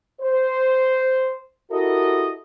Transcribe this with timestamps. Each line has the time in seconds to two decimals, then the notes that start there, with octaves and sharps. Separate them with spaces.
0.22 C5
1.72 E4 F#4 G4 A4 A#4 D#5